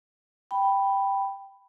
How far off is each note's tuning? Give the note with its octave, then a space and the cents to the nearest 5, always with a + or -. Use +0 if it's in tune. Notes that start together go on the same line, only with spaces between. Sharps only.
G5 +0 B5 +0